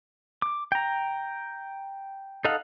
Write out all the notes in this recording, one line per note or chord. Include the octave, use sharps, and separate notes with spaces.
D6
G5 A#5
D#4 A4 D#5 F5 F#5